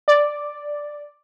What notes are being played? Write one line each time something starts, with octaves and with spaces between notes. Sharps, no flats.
D5